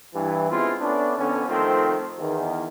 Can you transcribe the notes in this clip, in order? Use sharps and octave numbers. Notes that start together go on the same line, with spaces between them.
G2 E3
G#3 B3 C4 E4 F4
A3 B3 C#4 D4
F2 D3 B3 C#4
D#3 F3 A3 C4
E2 D#3